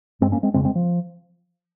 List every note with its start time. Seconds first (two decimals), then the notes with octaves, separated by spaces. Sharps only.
0.21 G2 G#3 C4
0.32 A#3 C#4
0.43 G#3 C4
0.54 F2 C#3 G#3 C4
0.65 G#3 C4
0.75 F3